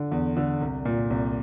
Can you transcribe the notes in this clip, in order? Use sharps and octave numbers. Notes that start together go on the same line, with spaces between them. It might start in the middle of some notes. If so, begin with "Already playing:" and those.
Already playing: D3
E2
D3
C2
A#2
C2